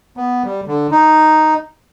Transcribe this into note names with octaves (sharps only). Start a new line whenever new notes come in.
B3
G3
D3
D#4